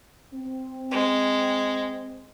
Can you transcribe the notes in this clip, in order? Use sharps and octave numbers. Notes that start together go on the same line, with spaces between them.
C4
G#3